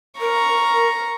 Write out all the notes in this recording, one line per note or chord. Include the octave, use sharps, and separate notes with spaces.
A#4 A#5 C#6